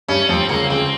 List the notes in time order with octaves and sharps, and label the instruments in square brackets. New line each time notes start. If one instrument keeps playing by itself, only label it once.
[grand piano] G2 G3 [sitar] C#4
[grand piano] F2 F3 [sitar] C4
[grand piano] C#2 C#3 [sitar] A#3
[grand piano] C#2 C#3 [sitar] C4